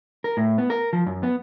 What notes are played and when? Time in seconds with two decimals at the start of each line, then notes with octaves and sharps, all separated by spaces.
0.24 A#4
0.37 A2
0.58 B3
0.70 A#4
0.93 F3
1.06 F#2
1.23 B3